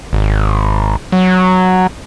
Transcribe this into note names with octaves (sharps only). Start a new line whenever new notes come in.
G#1
F#3